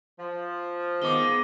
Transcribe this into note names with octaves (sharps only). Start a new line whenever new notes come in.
F3
D#3 G#3 B3 D6 G7